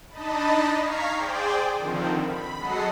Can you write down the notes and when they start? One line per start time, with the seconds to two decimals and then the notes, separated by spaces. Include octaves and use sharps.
0.10 D4 D#4 D#5 A5 B5
0.78 F5 A#5 C#6 G#6 B6 C7
1.12 G#4 C5 D5 G5
1.74 D3 D#3 F3 C4
2.24 B5
2.58 F#3 G#3 A4 D#5 F#5 C7